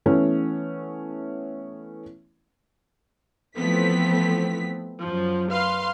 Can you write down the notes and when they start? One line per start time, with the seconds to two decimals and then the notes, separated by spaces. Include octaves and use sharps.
0.06 E3 A3 B3 C#4
3.57 E3 F3 A3 B3 C4 B6
5.01 F#2 F3
5.51 B4 F5 C6